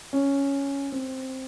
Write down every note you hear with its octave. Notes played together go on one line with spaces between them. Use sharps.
C#4
C4